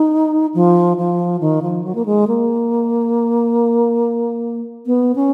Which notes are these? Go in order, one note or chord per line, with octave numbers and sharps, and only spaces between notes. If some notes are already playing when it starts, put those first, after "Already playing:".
Already playing: D#4
F3
F3
D#3
F3
F#3
A#3
G#3
A#3
B3
C#4